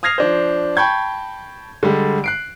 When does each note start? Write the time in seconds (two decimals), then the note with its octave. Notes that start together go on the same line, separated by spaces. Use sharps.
0.03 D#6 F6 G#6 A#6 C7 F7
0.18 F3 D4 C5
0.77 G5 A5 B5 C#6 G6 G#6
1.83 D3 G3 G#3
2.24 F#6 C7 D7